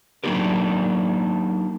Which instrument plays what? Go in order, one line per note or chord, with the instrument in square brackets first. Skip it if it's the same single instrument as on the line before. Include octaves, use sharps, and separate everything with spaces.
[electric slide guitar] F#3 A#3 D4 D#4 G4 A#4